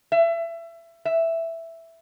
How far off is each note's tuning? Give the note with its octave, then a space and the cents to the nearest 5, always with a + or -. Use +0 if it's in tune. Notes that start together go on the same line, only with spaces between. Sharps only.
E5 +25
E5 +5